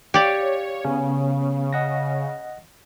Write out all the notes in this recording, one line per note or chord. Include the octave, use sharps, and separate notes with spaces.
G4 C#5 D5 F5
C#3 B3 C#4
D#5 F#5 A#6